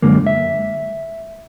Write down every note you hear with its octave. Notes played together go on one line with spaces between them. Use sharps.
F#2 D3 G#3 A#3
E5